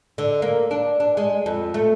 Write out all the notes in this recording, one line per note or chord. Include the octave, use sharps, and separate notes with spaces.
D3
A#3
D4
D4
G#3
F2
A3